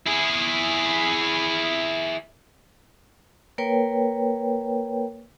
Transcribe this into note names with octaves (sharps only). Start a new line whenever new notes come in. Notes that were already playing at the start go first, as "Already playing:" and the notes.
E4 G#4
A#3 A#4 B4 C#5 G5